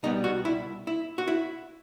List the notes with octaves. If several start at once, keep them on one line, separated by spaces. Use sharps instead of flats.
C2 B2 G3 B3 D#4
F#4
E4
E4
F#4
E4